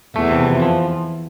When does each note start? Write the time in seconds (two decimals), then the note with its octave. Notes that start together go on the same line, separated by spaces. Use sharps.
0.15 E2 E3 A3
0.31 C3
0.46 F2
0.62 F3